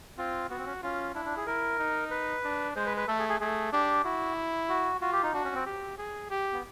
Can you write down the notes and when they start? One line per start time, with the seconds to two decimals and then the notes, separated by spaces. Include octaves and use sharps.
0.18 C4 F4
0.50 B3 F#4
0.58 C4
0.66 C#4
0.83 C#4 F4
1.15 D4 E4
1.25 D4
1.37 G#4
1.46 E4 A#4
1.79 D#4
2.11 B4
2.44 D4
2.76 G#3 C5
2.86 B4
2.97 B4
3.08 A3 A4
3.19 G#4
3.29 G#4
3.40 A3 G#4
3.72 D4 G4
4.04 E4 F#4
4.69 F#4
5.01 F4 F#4
5.12 G4
5.23 D#4
5.33 D4 F#4
5.45 C#4
5.55 C4
5.66 G4
5.98 G#4
6.30 G4
6.53 B3